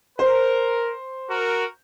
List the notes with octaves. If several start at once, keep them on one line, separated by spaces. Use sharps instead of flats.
A#4 C5
F#4 A#4